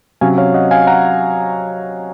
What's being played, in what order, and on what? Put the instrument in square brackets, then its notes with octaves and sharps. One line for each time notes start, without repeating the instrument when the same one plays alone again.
[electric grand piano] C3 F#3 C#4 F5 G#5
C#5 F5
D#5 F#5
F5 G#5
F#5 A#5